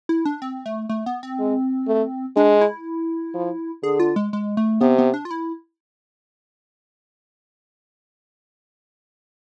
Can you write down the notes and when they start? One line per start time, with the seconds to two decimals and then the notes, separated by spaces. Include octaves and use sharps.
0.09 E4
0.25 D4
0.42 C4
0.66 A3
0.89 A3
1.06 B3
1.23 C4
1.40 G#3
1.88 A3
2.36 G#3 D4
2.61 E4
3.35 F3
3.83 D3 G#4
4.00 F4
4.16 G#3
4.33 G#3
4.57 A3
4.81 C3 B3
4.98 B3
5.14 D4
5.25 F4
5.31 E4